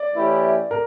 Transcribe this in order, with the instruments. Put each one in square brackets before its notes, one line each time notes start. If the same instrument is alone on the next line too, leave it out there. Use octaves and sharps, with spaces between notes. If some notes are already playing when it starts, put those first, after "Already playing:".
Already playing: [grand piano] D5
[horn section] E3 A3 C#4 E4 G4
[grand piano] A#4